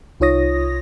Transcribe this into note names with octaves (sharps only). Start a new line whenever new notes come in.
C2 D#4 F4 C#5 D#6 A#6